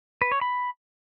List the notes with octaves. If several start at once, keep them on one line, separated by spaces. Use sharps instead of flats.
B4
C#5
B5